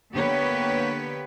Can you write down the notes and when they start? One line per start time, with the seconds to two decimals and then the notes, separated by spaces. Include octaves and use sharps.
0.13 D3 A#3 B3 G4 B4 C#5